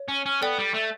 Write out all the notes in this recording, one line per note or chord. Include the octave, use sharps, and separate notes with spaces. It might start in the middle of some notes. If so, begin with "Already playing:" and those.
Already playing: C#5
C#4
C#4
B3 A4 D5 G5
G3
A3